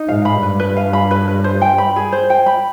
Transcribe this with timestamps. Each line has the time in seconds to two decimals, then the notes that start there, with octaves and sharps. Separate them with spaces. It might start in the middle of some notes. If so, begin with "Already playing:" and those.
Already playing: D#4
0.09 G#2 F5
0.25 B5
0.42 G2 B4
0.60 B4
0.77 F5
0.93 B5
1.11 B4
1.28 B4
1.44 C5
1.61 G5
1.78 B5
1.96 G#4
2.12 C5
2.30 G5
2.46 B5